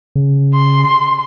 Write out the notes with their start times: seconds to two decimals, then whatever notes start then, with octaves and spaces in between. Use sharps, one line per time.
0.16 C#3
0.54 C6